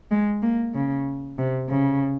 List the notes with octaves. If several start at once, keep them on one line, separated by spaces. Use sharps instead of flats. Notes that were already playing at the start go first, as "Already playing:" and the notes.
G#3
A#3
C#3
C3
C#3